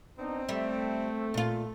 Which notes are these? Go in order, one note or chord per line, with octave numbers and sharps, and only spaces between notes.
B3 C4 D4 D#4
G3 A3 E5
A#2 F4